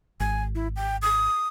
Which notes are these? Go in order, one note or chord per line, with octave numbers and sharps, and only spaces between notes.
G#1 G#5
E4
G5
D#6